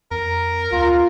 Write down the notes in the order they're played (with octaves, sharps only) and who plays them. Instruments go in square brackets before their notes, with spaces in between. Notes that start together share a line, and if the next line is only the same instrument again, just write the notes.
[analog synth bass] F2 [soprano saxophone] A#4
[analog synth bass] D2 [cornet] F4